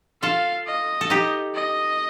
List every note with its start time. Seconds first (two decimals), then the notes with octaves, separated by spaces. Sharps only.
0.22 F4 A4 F5
0.67 D#5
1.01 A4
1.10 D#4 G4
1.55 D#5